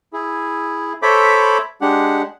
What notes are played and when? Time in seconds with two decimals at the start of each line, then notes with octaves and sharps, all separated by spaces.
0.13 E4 G#4
1.02 A4 C5 C#5 E5 B5 D6
1.81 G#3 D4 G4 F#5